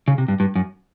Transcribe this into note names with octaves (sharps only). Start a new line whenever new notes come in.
C#3
C3
G2
G2
F#2